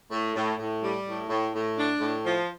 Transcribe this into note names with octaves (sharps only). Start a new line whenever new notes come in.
A2
A2
A2
G3
A2
A2
A2
D4
A2
F3